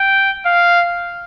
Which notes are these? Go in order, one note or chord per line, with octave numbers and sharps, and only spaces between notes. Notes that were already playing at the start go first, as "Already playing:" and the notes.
Already playing: G5
F5